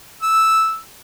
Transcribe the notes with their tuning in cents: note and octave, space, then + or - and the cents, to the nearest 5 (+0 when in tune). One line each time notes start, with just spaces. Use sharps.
E6 -5